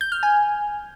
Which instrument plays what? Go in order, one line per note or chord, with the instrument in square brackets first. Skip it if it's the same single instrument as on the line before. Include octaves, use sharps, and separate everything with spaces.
[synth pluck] G6
F6
G#5